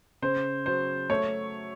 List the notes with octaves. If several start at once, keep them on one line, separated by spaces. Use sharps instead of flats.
C#3 C5
F#3 C5
A3 C#5